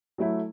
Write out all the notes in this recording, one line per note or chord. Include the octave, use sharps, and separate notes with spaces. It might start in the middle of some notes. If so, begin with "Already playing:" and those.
F#3 A3 E4